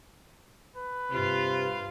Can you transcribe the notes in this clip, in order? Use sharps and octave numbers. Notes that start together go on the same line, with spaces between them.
B4
G2 C3 F4 F5